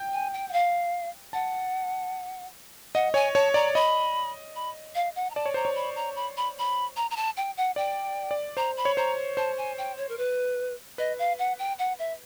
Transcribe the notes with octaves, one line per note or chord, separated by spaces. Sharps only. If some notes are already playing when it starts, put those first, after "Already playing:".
Already playing: G5
G#5
G5
F#5
F5
F#5 A5
D#5 F#5
C#5 G#5
C#5 A5
D5 A#5
D#5 B5
B5
F5
F#5
A#5
D5 A5
C#5
C5 A#5
C#5
B5
A#5
B5
B5
B5
A#5
A#5
A5
G5
F#5
D5 G5
D5
C5 A#5
B5
C#5
C5 A#5
C5 A5
G#5
G5
C#5
A#4
B4
B4 D#5
F5
F#5
G5
F#5
E5